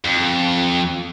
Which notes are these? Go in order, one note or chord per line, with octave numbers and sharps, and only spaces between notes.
F2